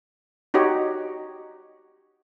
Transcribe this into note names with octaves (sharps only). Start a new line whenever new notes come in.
D#4 F#4 G4 C#5 D#5